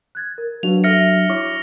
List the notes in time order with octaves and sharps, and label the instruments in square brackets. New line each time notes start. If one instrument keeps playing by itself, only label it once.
[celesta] F#6 G#6 A6
A#4
[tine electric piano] F#3 D4 F#4 [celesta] B4 F5 [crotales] F7
[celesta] A4 E5 [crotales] F6 A#6 C#7
[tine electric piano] E4 [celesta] C#5 C#6 D6